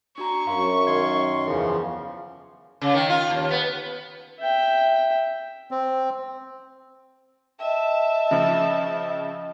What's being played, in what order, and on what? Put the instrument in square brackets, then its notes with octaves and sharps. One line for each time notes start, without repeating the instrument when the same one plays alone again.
[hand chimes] D4 F#4 A#5 [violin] C#6
[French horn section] F#2 [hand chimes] F5 C6
[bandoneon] D#3 C6 [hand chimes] D#5 G#6
[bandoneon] E2 C#3 F3 [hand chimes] G#4 F5
[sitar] C#3
D#3
F4
D#2
B3
[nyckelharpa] E5 G5
[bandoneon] C4
[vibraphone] D#5 G5 [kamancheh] E5 A5
[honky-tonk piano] C#3 F3